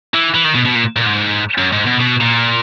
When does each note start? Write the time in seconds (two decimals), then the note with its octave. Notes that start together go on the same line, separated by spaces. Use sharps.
0.14 E3
0.35 E3
0.45 D#3
0.55 B2
0.65 B2
0.75 A#2
0.97 A#2
1.06 G#2
1.58 F#2
1.72 G#2
1.86 B2
2.00 B2
2.20 A#2